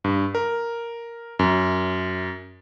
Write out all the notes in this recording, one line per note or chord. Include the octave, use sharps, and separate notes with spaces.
G2
A#4
F#2